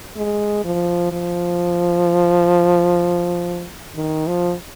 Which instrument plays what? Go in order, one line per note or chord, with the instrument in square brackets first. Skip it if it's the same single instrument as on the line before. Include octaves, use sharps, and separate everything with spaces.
[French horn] G#3
F3
F3
D#3
F3